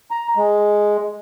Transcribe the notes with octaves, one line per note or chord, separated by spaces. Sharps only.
A#5
G#3